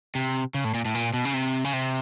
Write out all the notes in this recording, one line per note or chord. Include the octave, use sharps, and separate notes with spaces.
C3
C#3
A2
A#2
A2
A#2
B2
C#3
C3
C#3
C3